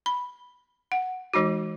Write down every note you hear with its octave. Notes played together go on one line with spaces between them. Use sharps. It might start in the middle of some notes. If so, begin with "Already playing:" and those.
B5
F#5
E3 G#3 D#4 F#4